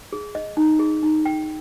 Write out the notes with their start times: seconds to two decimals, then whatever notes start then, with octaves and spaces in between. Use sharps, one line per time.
0.13 G#4
0.35 D#5
0.57 D#4
0.79 G#4
1.03 D#4
1.25 G5